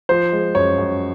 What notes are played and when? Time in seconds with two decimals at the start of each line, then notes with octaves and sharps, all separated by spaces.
0.09 F3 C5
0.32 G#3
0.55 F#2 C#5
0.78 F#2